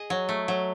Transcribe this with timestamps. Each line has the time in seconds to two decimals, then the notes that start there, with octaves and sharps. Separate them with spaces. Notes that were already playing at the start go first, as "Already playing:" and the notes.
Already playing: G#4 D#5
0.10 F#3
0.29 A3
0.48 F#3